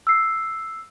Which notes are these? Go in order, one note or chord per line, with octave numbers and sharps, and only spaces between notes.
E6 C7